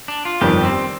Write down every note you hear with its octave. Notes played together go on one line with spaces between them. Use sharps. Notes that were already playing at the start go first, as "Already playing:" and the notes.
D4
F4
G1 F2 D#3 G3 G4
C4